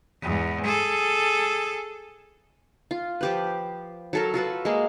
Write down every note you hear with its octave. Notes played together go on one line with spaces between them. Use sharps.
E2 G#2
G#4 A4
F4
F3 G4 B4
F#3 A4 A#4
F4 F#4 A4 B4
G#3 A#3